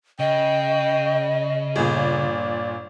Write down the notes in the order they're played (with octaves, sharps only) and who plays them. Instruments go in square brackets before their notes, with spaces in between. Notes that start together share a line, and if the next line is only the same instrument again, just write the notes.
[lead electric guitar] C#3 [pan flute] D#5 [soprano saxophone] G5
[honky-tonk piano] G1 A#2 [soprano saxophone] G#4
[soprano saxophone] D5